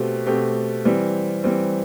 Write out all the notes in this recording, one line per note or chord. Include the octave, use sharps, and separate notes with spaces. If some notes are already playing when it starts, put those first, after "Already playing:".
Already playing: B2 A3 C4 G4
B2 A3 C4 G4
E3 G3 C4
E3 G3 C4